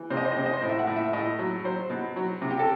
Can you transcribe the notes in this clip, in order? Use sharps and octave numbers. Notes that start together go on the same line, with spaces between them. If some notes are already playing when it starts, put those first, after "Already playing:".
Already playing: E3
C3 C5
D#5
C5
D#5
C3 C5
D#5
C5
A2
E5
F#5
A2
E5
A2 D#5
F#3
F#3 C5
B2
F#3
C3
G4
A4